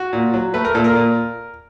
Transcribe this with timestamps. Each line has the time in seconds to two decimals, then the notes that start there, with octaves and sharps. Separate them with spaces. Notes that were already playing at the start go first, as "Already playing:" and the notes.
Already playing: F#4
0.13 A#2
0.34 F#3
0.54 A3 B4
0.65 A#4
0.75 A#2 A4
0.84 A#4
0.95 A#2